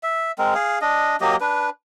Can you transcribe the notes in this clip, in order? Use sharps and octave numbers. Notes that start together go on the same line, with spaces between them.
E5
G#3 C4 A#4
G#4 F5
D4 D#5
F#3 A#3 G4 D#5
D4 B4